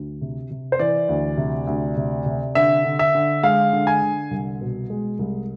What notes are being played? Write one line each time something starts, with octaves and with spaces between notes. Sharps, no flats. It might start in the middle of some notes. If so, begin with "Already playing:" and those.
Already playing: D2
C3
C3
C5
E3 D5
D2
C3
D2
C3
C3
D3 E5
D3
E5
D3
G#3 F5
D3
G#5
D3
C2
B2
G#3
C2